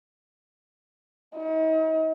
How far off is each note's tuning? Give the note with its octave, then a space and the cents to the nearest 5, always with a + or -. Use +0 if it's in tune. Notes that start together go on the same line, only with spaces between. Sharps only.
D#4 +40